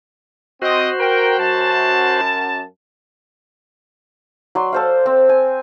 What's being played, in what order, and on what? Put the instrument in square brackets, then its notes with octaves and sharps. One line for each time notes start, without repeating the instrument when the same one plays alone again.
[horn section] C4 D#5 [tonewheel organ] F#4 C5
[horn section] A#4 G5
F#2 A5
[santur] F#3 D5 C6
A4 C5 F5
C4
G#5